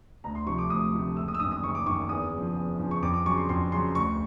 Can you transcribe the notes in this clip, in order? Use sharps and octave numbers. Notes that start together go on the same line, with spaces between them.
D2 A#5
C6
C3 F3 A3 C#6
D6
D2 D#6
C3 F3 A3
F#1 E6
D#6
E6
F#2 D#3 D#6
D#6
F#1 C#6
D6
F#2 D#3 C#6
E2 D#6
C#3
F3
E2
C#3 F3
C#6
F2 D6
D6
C#3 F#3 C#6
C6
F2 C6
C#3 F#3 C6
D2 C#6